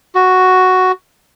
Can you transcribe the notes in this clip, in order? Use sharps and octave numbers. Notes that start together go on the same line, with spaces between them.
F#4